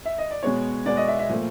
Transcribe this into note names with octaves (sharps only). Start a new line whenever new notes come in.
E5
D#5
D5
B2 G#3 B3 C#5
B2 G#3 B3 D5
D#5
E5
E5
A#2 F3 A3